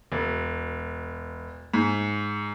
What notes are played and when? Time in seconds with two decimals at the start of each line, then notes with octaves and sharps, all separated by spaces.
0.12 E1
1.74 G#2